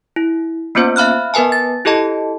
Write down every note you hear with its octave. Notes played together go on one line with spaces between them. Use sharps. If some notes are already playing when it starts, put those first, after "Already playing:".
E4
A#3 B3 C#4 F4 C5
E5 F5 B5 F6 F#6
B3 A#4 B4 G#5 A5
A6
E4 G4 A4 D#5 A5